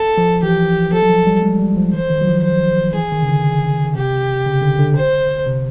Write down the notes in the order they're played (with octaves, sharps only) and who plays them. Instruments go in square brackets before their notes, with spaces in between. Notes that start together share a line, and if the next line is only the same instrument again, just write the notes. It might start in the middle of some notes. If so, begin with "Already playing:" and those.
Already playing: [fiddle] A4
[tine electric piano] F3
[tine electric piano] E3 [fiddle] G4
[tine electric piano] F3 [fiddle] A4
[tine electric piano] F#3
F3
G3
G#3
G3
F3
[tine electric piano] E3 [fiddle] C5
[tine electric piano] D#3
F#3
F3
[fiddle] C5
[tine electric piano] E3 [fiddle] G#4
[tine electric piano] D#3
C#3
D3
[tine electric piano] C3 [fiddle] G4
[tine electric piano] C#3
D3
D3
[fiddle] C5
[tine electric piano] C3